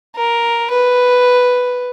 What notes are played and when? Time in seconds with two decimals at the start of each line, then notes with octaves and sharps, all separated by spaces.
0.16 A#4
0.70 B4